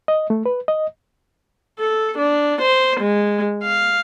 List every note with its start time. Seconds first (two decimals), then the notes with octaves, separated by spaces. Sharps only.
0.08 D#5
0.30 A3
0.46 B4
0.68 D#5
1.79 A4
2.18 D4
2.62 C5
3.01 G#3
3.64 F5